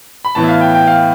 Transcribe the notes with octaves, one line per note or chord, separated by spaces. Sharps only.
B5
A2 E3 B3 A5
E5
F5
G5
G5
F5